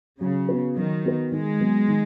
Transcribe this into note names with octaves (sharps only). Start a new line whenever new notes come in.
C#3 F#3
B3 F#4 B4
D#3 F#3
B3 F#4 B4
D#3 G#3
F#3 B3
D#3